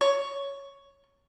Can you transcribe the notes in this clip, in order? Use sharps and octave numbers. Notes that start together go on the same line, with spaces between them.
C#5